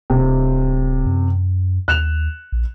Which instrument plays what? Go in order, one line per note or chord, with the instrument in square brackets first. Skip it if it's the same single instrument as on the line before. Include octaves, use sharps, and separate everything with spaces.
[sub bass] D1 [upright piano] C3
[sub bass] F#2
[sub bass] D#2 [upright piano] F#6 E7 F7
[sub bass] A#1